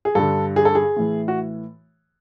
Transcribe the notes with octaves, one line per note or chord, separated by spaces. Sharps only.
G#4
G2 D3 A4
G#4
A4
G#4
A2 E3
F#4